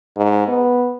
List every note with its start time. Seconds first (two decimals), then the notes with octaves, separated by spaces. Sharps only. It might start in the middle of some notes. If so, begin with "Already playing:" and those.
0.17 G#2
0.47 B3